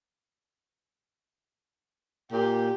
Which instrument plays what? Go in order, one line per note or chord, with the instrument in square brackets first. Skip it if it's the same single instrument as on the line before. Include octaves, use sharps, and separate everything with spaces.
[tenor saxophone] A#2 [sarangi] G4